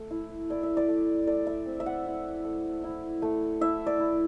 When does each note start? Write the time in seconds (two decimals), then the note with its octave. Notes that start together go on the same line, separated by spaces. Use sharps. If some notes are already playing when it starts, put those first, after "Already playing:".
Already playing: A3
0.11 E4
0.50 E4 D5
0.63 E5
0.77 D5
0.88 A3
1.27 A3 D5
1.47 E5
1.66 C4
1.80 E5
1.86 F#5
2.06 E4
2.45 A3
2.84 E4
3.22 A3
3.61 E4 E5
3.87 D5
3.99 E4